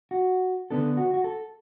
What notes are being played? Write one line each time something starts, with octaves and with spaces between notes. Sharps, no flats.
F#4
D3 B3 D4 A4
F#4
F#4
A4